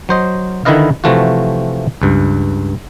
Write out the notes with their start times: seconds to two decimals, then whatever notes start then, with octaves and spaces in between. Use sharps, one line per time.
0.09 F#3 C5 D#5
0.65 D3 D#3 E4 B4 D#5 F5
1.04 C3 E3 F3 A3 F4 F#4
2.02 C#2 G2